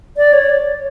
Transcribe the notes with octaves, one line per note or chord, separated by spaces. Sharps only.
D5
C#5